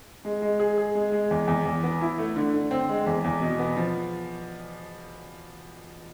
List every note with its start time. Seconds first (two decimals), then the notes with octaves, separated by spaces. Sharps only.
0.25 G#3
0.42 G#3
0.60 G#4
0.78 G#4
0.95 G#3
1.12 G#3
1.31 E2
1.48 E2
1.65 E2
1.83 B3
2.01 E4
2.18 A3
2.36 D3
2.54 D3
2.71 C4
2.89 G#3
3.06 E2
3.24 E2
3.41 B2
3.59 B3
3.77 F3